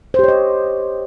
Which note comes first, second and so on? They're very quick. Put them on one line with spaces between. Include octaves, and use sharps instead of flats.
C5 G4 C#5 D#5